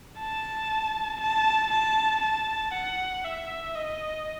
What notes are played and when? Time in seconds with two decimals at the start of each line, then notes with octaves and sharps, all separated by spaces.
0.19 A5
1.20 A5
1.71 A5
2.23 A5
2.73 F#5
3.24 E5
3.75 D#5